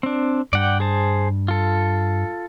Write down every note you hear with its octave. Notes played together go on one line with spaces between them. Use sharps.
C4 D4
G2 D5 F#5 G5
G#4 C5 A5
F4 A4